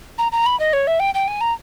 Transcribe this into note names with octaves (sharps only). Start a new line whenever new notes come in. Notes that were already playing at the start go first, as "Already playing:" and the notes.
A#5
A#5
B5
D#5
C#5
E5
G5
G5
G#5
A#5